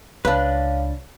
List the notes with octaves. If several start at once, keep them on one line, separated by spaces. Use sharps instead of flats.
C#2 D4 B4 C#5 F5 A5